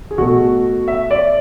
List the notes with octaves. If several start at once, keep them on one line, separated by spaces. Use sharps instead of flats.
G#4
B2 A3 F#4
E5
D5